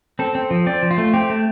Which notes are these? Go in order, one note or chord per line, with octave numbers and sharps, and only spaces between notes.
C4 A4
C4
F3
C4 D5
F3
F4
A3
C4 G4
A3